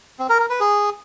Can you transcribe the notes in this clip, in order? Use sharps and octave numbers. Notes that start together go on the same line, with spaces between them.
C4
A#4
A#4
B4
G#4